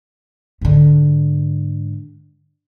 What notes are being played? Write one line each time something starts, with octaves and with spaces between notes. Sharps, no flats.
G#2 D3